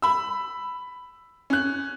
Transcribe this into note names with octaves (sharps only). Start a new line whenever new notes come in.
B5 E6
C#4 F#6